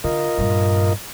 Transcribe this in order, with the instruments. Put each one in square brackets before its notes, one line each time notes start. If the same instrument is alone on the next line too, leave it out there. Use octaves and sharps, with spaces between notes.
[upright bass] D3 [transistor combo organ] F4 A#4 D#5
[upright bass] G2 A#2